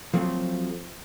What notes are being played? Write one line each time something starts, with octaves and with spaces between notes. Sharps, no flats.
F3 F#3 A3 C4